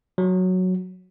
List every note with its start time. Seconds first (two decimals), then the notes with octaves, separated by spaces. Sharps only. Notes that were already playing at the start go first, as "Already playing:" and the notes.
0.18 F#3